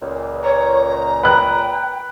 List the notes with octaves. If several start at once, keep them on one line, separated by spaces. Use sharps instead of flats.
C#2 A#2
C#5 A#5
B4 G5 F#6